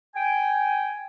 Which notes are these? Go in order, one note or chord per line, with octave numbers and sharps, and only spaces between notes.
G5 G#5